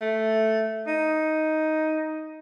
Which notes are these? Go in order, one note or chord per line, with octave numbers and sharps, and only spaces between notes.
A3
D#4